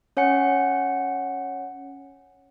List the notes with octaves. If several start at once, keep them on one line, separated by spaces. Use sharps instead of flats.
C#4 C#5 F#5 G#5 C#7